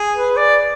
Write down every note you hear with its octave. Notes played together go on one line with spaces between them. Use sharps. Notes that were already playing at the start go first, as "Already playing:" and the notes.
Already playing: G#4
B4
D5